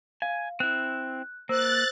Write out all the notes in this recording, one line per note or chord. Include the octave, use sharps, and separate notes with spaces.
F5 G#5
C4 E4 F#6
A#3 C5 E6 F#6 A6